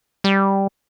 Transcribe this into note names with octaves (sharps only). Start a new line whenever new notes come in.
G3